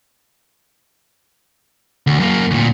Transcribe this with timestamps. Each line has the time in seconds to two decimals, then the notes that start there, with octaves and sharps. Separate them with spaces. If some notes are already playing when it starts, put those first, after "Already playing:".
2.07 D2
2.20 F#2 A#3
2.51 D2 A#2